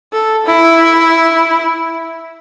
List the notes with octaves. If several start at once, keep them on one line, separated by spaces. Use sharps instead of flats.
A4
E4